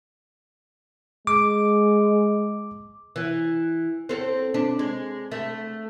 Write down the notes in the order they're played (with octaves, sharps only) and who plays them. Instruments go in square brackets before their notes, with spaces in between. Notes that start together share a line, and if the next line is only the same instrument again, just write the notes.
[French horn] G#3 [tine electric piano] D6
[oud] E3
C4 A4
D4
G#3
A3